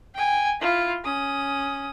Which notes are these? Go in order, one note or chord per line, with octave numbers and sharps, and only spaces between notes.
G5 G#5
E4 F4
C#4 D#6